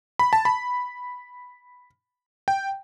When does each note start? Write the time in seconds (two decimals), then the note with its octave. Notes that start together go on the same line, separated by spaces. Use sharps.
0.19 B5
0.33 A5
0.45 B5
2.48 G5